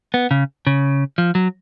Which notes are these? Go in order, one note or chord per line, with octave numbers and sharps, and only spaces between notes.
B3
C#3
C#3
F3
F#3